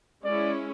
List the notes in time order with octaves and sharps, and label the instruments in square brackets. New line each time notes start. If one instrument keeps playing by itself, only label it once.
[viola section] G#3 C#4 E4 [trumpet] D5